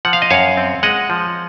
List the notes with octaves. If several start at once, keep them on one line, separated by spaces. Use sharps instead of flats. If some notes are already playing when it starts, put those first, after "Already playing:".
F3 F#5
F5
D#5
F#2 C#5 F5
C4
G#3 D#5 F#5
F3